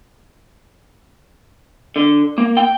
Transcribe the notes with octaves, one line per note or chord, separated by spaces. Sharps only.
D3
A#3
G5